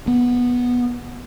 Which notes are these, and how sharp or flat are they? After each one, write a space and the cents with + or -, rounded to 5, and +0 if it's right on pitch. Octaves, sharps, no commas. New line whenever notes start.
B3 -10